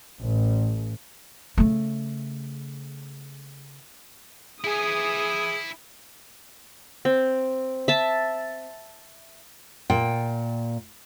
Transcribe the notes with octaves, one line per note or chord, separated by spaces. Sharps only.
A1
C#3 A3
E4 G#4 G#5 D#6
C4
E5 A5
A#2 G5